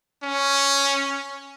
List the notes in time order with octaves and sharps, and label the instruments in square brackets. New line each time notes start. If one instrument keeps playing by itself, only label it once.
[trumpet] C#4